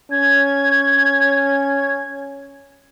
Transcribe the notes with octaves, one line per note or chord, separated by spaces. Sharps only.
C#4 G#6